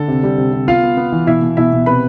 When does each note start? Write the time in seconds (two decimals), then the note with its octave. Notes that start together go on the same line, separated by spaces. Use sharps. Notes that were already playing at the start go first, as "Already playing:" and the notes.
Already playing: D3 A4
0.08 C3
0.23 G3
0.38 C3
0.53 C3
0.67 B3 F4 F5
0.83 B3
0.97 B3
1.12 E3
1.27 B2 E4 E5
1.42 B2
1.57 B2 E4 E5
1.73 B2
1.86 C3 B4 B5